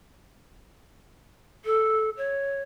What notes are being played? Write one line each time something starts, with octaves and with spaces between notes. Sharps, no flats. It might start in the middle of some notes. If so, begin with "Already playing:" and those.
A4
C#5